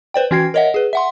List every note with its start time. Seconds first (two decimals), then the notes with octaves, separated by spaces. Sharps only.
0.14 B4 C5 D5 G5
0.31 E3 C#4 F#4 G5 G#6 C7
0.54 A#4 C#5 D#5 E5 F#5
0.74 G#4 B4
0.93 E5 F#5 C6